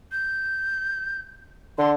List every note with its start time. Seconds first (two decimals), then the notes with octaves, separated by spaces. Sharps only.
0.12 G6
1.78 D3 C6